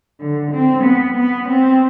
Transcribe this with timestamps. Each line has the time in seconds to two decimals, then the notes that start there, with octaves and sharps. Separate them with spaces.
0.20 D3
0.52 C4
0.84 B3
1.16 B3
1.48 C4